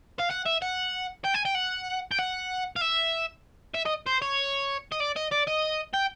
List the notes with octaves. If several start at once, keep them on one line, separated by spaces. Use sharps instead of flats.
F5
F#5
E5
F#5
G5
G#5
G5
F#5
G5
F#5
F5
E5
E5
D#5
C5
C#5
D#5
D5
D#5
D5
D#5
G5